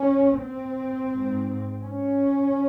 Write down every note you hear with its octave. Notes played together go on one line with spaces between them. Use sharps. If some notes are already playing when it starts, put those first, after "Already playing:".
Already playing: C#4
C4
G#2
C#4